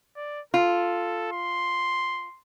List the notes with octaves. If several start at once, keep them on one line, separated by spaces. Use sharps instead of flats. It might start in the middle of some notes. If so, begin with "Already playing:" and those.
D5
F4 A4
C6